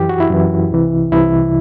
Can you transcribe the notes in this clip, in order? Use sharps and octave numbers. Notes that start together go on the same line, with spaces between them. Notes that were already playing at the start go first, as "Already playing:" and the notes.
Already playing: F#2 E3 G4
F#4
E4
F#2 E3
C2 C3 E3
C2 C3 E3 E4